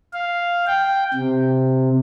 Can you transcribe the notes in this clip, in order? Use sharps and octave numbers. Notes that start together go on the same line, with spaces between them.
F5
G5
C3